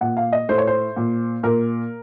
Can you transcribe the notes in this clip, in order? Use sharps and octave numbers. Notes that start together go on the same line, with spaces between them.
A#2 F#5
F5
D#5
A2 C5
C#5
C5
A#2
A#2 A#4